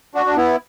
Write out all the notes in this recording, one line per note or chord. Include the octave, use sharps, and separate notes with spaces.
D4 F#4
D4
B3 E4